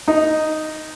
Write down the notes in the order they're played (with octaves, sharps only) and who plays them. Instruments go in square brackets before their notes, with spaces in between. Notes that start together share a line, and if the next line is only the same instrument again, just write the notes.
[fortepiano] D#4